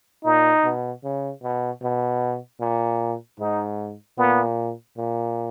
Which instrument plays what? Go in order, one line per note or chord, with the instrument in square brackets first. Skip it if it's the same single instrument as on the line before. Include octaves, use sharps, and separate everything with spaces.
[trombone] A#2 [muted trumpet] D#4
[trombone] B2
C#3
B2
B2
A#2
[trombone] G#2 [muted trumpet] D#4
[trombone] A#2 [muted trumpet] B3
[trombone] A#2